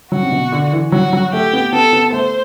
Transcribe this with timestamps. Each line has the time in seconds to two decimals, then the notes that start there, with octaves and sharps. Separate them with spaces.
0.12 F#3 F#4
0.23 C3
0.32 B2
0.52 D3
0.73 E3
0.92 F#3 F#4
1.13 F#3
1.33 A3 G4
1.53 B3
1.73 B3 A4
1.93 B3
2.12 A3 C5